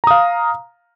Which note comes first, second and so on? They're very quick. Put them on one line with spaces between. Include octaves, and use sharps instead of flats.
A#5 D#6 F5